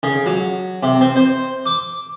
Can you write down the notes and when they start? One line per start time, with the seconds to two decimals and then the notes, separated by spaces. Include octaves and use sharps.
0.03 C#3
0.26 F#3
0.83 C3
1.01 C4
1.16 C5
1.66 D6